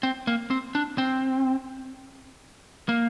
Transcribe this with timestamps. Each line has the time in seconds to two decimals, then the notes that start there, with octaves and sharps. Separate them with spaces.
0.03 C4
0.27 A#3
0.50 C4
0.75 D4
0.98 C4
2.89 A#3